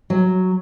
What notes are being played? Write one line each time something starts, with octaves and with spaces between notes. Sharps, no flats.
F#3